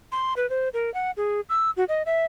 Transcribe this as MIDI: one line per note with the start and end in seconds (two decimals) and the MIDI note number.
0.12 0.33 84
0.36 0.49 71
0.50 0.69 72
0.74 0.93 70
0.94 1.11 78
1.17 1.40 68
1.49 1.71 88
1.77 1.84 66
1.89 2.02 75
2.06 2.25 76